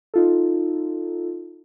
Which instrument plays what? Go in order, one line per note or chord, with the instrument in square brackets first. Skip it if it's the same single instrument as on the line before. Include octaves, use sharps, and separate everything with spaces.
[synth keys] D#4 F4 A4